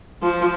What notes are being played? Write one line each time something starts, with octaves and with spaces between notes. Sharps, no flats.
F3